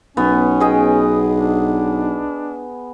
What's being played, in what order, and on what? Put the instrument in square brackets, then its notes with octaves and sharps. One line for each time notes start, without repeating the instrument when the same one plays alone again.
[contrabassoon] B1 [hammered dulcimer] B3 [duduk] C#4
[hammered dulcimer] G#4 D#5 G5
[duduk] D4